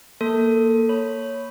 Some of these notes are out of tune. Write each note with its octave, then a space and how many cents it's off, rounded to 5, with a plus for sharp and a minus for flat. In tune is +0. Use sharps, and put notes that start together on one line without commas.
A#3 +0 A4 +15
C#5 +0 B5 +0